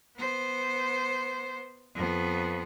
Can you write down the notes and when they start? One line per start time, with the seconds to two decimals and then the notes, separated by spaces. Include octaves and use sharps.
0.17 B3 C5
1.95 F2 B3